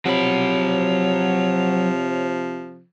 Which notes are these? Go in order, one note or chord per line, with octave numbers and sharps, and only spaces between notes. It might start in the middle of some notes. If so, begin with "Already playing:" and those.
C3 F3 F#3 C#5 B5